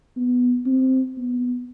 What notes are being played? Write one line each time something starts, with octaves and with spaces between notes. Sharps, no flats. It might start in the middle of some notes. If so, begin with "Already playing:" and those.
B3
C4
B3